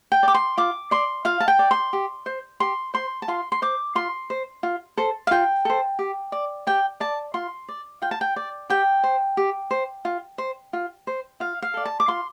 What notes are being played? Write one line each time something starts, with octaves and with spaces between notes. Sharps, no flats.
G5
D5
D6
C6
F4 D6
D5 C6
F4 F5
A5
G5
D5
C6
G4
C5
G4 C6
C5 C6
A5
F4 C6
C6
C5 D6
F4 C6
C5
F4
A4 C5
F5
F4 G5
A4 C5
G4
D5
G4 G5
D5 A5
F4 C6
D5
F4 G5
A5
G5
D5
G4 G5
C5
G4
C5
F4
C5
F4
C5
F4 F5
F5
A4 D5
A5
D6
F4 C6